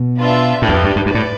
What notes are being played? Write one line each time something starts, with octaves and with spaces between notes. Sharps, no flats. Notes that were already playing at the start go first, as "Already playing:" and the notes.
Already playing: B2
D4 F4 B4 E5
A2 D4 G4 B4
E2
F2
G2
G2
G2 B4 D5
A2